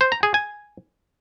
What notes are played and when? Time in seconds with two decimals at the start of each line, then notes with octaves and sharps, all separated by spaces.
0.01 C5
0.12 A#5
0.23 G#4
0.34 G#5